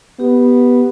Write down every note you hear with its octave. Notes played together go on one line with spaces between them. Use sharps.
B3 G4